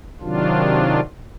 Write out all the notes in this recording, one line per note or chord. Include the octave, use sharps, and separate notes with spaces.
C3 D#3 F#3 D4 F4